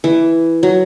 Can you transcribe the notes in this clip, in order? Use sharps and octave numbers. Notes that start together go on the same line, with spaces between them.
E3
F#3